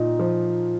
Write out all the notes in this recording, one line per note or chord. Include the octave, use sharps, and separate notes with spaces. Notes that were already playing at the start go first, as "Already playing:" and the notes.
Already playing: A#2 D#4
F3